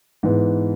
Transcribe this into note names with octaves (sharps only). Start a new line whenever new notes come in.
G#2 E3 B3